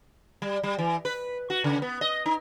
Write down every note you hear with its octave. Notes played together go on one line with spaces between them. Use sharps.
G3
G3
E3
B4
F#4
C#3
B3
D#5
D#4